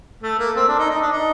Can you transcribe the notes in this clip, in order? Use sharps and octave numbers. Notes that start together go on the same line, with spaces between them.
A3
A#3
C4
D4
D#4
D#4
D4
D#4